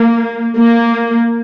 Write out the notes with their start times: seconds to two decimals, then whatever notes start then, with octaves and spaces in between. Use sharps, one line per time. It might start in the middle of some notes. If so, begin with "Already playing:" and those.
Already playing: A#3
0.57 A#3